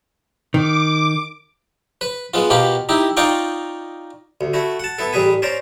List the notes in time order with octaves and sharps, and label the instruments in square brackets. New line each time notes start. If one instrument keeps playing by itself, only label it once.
[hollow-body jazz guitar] D#3 [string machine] D6
[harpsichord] B4
G#3 B3 F4
B2 A#3 F4 G4 B5
D#4 E4 G4
D#4 F4 D5 F5 G5 C#6
D2
A3 E4 F#4
F#5 A5
B3 E4 A4
A1 G3 G#4 B4 G#5
C#4 C5 D5 A#5